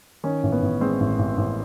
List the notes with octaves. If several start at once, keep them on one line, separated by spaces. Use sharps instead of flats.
D#3 C#4
A1
B3
A1
G#3 C4
A1
A1
A1